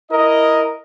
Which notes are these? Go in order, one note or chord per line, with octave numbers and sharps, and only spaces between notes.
E4 A#4 D#5